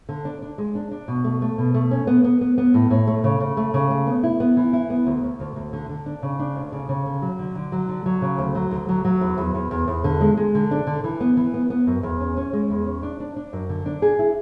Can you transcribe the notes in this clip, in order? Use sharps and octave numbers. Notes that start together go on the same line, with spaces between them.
D3
D4
D4
G#3
D4
D4
B2
A3
A3
B2
A3
C#4
B3
B3
B3
B3
A2
A2
A3
C#3
C#3
A3
C#3
A3
B3
E4
B3
E3
E4
B3
D2
D2
D2
D2
D3
D3
D4
C#3
D4
D2
C#3
C#3
D3
F#3
D3
D3
F#3
D3
F#3
C#3
D2
F#3
D2
F#3
F#3
E2
E2
E2
E2
E2
D3
G#3
G#3
D3
D4
D3
E3
B3
E3
B3
B3
F#2
E2
C#4
C#4
G#3
E2
C#4
D4
D4
D4
F#2
D3
D4
G#4
E4